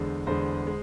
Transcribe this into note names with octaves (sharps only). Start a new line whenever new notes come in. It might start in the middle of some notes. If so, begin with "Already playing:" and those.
Already playing: E2 D3 G#3 C5
E2 D3 G#3 C5
G#3